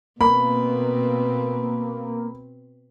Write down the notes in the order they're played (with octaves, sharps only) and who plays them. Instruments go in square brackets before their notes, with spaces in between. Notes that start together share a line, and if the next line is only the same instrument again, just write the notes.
[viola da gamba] B2 C4 [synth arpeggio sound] A#3 [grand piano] B5